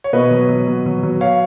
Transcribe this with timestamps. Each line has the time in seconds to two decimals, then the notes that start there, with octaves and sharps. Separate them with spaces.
0.04 C#5
0.13 B2 B4 D#5
0.31 F#3
0.49 F#3
0.68 F#3
0.86 F#3
1.03 F#3
1.21 C#5 F5